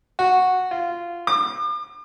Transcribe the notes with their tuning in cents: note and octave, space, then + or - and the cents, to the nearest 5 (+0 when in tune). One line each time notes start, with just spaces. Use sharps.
F#4 -10
F4 -15
D6 +40